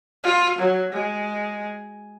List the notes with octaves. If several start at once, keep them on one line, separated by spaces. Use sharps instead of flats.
F4
F#3
G#3